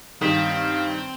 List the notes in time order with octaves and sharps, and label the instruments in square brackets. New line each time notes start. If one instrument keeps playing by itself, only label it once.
[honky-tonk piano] G2 D#3 [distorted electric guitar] C4 [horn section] F5 [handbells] D#6 B6